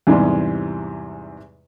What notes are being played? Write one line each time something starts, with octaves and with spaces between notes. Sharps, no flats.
E2 G#2 C3 E3 G3 G#3